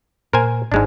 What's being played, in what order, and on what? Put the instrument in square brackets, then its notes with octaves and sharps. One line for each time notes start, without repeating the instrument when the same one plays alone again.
[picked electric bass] A#2 [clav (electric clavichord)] A#4 C5 G#5
[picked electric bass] G#1 [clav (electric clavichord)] G#2 G#3 D4